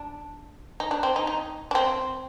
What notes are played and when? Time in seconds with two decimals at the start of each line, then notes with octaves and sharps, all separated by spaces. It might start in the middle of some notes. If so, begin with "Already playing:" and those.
Already playing: D4
0.80 D#4
0.91 D4
1.03 C4
1.16 D#4
1.27 D#4
1.71 D4
1.75 C4